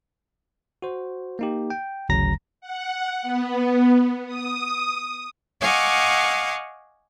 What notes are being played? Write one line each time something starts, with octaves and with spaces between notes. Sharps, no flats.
F#4 C5
A#3 D#4 G4
G5
G#1 D2 C#3 F#3 A#5 A#6
F#5
B3
D#6
D#5 F5 F#5 G#5 C#6 D6